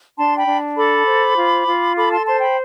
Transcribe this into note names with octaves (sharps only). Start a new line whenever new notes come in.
D4 A5 C6
G5 B5
D4
A4 B5 D6
C5
F4
F4
A4 B5 D6
A5 C6
C5 A5 C6
G5 B5